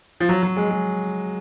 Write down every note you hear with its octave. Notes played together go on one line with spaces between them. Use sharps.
F3
F#3
F#3
G#3
G#3